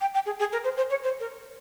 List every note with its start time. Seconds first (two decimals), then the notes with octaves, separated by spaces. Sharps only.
0.01 G5
0.14 G5
0.26 G#4
0.39 G#4
0.52 A#4
0.64 C5
0.77 C5
0.90 C#5
1.03 C5
1.20 A#4